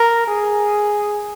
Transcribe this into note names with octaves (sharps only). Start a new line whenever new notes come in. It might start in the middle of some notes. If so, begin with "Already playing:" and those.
Already playing: A#4
G#4